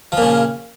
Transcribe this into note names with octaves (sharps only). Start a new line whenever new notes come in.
A#2 C#3 F3